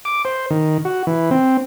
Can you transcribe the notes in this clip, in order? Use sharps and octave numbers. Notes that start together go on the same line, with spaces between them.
D6
C5
D#3
F#4
E3
C4